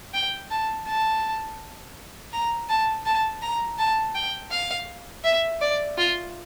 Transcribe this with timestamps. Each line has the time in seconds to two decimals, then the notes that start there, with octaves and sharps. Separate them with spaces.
0.14 G5
0.50 A5
0.87 A5
2.33 A#5
2.69 A5
3.06 A5
3.42 A#5
3.79 A5
4.15 G5
4.51 F5
5.24 E5
5.61 D5
5.98 F4